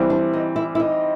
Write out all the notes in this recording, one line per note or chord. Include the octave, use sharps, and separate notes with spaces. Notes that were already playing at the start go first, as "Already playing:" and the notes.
Already playing: E3 G3 C4
D4
D#4
E4
E4
D#4